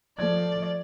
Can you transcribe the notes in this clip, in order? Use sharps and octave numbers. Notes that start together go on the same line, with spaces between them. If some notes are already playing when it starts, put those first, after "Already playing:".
F3 A3 D5 G#6